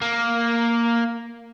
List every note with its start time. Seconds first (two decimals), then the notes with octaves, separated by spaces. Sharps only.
0.01 A#3